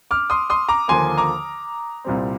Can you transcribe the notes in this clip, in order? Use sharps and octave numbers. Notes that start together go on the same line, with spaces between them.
D6 F6
C6 D#6
C6 D#6
A#5 D6
D#2 D3 F3 A#3 G#5 C6
A#5 D6
C2 A#2 G3 C4